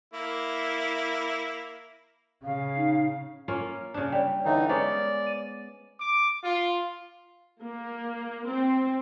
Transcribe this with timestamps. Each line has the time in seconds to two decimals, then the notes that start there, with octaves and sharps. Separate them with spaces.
0.13 A#3 E4
2.44 C#3 F5
2.76 D#4
3.48 A#3 C#4 F4
3.94 C#3 D4
4.12 G3 C#5 D5 G5
4.45 D3 E3 D#4 C#5 E5 G5
4.69 G#3 B3 C#4 C5 D5
5.27 D#7
5.99 D6
6.42 F4
7.63 A#3
8.47 C4